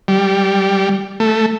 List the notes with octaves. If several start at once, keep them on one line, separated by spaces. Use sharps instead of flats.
G3
A3